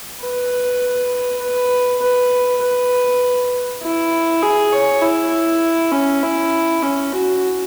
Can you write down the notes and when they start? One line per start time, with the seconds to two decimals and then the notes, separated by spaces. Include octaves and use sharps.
0.22 B4
1.42 B4
2.02 B4
2.62 B4
3.83 E4
4.42 G#4
4.73 C#5
5.02 E4
5.92 C#4
6.23 E4
6.83 C#4
7.12 F#4